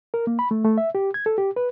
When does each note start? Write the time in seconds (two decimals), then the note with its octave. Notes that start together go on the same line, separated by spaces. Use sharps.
0.14 A#4
0.27 A#3
0.39 B5
0.51 A3
0.65 A3
0.78 E5
0.95 G4
1.14 G#6
1.26 A4
1.38 G4
1.56 B4